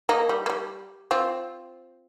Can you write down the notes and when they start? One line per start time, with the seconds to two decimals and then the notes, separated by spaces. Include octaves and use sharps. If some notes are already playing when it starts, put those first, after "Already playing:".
0.09 A#3 D#4
0.29 G3
0.46 A#3
0.50 G3
1.11 C4 F4